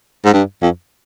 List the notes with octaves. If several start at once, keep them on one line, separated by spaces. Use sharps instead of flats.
G#2
G2
F2